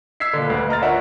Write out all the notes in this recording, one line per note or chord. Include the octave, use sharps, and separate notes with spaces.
E6 G#6 B6 C7
A#2 D3
D2 B4
D#5 A#5 F6 A6
D4 F4 A#4 C#5 E5 F#5